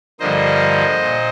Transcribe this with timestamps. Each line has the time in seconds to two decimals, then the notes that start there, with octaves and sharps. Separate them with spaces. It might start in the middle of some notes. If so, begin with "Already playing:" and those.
0.20 G2 D3 F3 A#3 C5 D#5
1.01 A#2